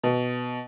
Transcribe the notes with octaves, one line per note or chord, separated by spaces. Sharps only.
B2